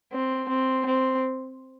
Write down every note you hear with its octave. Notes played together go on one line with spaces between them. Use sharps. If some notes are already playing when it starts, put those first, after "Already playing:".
C4
C4
C4